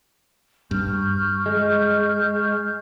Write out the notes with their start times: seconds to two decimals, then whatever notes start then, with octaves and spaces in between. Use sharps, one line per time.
0.71 G2 C#6 F6 G6
1.46 G#3